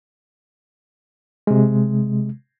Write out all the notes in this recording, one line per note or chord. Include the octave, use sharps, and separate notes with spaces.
C3 G#3